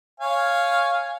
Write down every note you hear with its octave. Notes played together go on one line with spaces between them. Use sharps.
C#5 F5 G#5